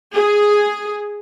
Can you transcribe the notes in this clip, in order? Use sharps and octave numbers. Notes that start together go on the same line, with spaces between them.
G#4